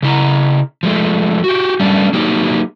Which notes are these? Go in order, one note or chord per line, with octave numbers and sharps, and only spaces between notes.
C#3 E4 A#5
F3 G#3 A3
F#4 G4
G3 A3 C#4 D4
F#3 A#3 D4 D#4 G4 G#4